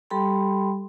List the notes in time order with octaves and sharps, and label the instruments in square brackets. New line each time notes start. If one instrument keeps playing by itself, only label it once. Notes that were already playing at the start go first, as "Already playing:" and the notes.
[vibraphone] G3 G4 A4 G5 B5 C6